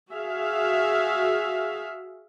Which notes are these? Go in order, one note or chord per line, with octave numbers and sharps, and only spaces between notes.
F#4 G#4 E5 F5